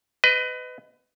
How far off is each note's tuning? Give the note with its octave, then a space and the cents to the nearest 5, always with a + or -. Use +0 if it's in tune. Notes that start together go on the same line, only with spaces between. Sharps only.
B4 +25 D#5 +0